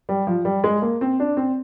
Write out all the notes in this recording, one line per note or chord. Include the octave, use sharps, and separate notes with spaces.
G3
F3
G3
G#3
A#3
C4
D4
C4